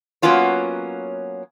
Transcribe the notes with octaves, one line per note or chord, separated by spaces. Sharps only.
F#3 A#3 B3 C#4 F4 C#5